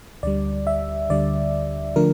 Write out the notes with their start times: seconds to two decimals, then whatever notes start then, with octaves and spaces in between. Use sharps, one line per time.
0.23 D2 D3 G3 D5
0.67 E5
1.10 D2 D3 G3 D5
1.96 D3 F3 A3 D4 A#4